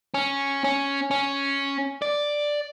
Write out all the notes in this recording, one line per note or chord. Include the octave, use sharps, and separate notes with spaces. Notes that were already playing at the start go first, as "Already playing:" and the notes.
C#4
C#4
C#4
D5